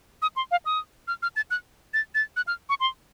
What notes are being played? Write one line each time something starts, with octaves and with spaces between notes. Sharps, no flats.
D#6
C6
F5
D#6
F6
F6
A6
F#6
A6
A6
F#6
F6
C#6
C6